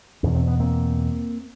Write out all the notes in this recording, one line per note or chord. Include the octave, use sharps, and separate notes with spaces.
E2 B2 C#4
C4
B3
A#3 C4